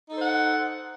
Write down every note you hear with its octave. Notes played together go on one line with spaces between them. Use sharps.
D#4 A4 C5 F#5